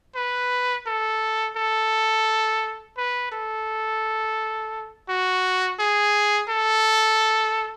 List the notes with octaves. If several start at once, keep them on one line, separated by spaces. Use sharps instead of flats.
B4
A4
A4
B4
A4
F#4
G#4
A4